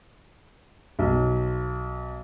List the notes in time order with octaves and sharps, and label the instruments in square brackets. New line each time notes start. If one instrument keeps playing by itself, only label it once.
[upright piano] B1